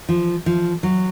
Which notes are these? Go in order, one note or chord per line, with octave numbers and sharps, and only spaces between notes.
F3
F3
F#3